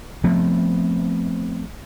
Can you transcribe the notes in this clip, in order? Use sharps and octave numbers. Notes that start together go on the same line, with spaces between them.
F3 A3 B3 C4